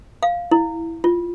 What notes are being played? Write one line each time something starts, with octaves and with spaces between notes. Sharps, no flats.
F5
E4
F4